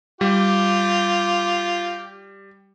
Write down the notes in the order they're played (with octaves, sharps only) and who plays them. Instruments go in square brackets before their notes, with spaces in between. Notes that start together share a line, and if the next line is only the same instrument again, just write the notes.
[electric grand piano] G3 [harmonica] F4 G4